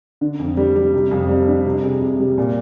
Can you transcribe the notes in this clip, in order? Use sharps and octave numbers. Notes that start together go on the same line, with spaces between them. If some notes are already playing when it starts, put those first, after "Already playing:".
D3
F2
G3
G3
C3
F2
G3
D4
C3
G#4
C3
G3
A#2